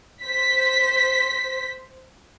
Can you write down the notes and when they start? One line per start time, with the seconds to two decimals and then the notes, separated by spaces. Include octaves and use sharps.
0.24 C5 B6